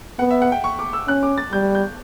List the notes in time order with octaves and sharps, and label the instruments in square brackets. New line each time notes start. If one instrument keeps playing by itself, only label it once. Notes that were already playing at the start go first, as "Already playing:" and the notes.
[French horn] B3 [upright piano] F#5
[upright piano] E5
F#5
G5
C#6
D6
E6
[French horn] C#4 [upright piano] F#6
[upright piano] D6
A6
[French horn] G3 [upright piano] G6
[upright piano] G6